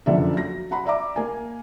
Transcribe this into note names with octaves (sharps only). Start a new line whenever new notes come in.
F#1 F2 D3 A4 D5 E5
F#3 A#6
F#5 A#5 B5
D5 E5 A#5 D6
A#3 G#5